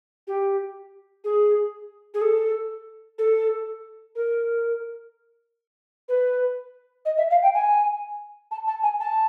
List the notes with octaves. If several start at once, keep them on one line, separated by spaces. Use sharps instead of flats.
G4
G#4
G#4
A4
A4
A#4
B4
D#5
E5
F5
G5
G#5
A5
A5
G#5
A5